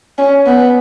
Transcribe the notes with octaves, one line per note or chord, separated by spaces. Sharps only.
C#4
B3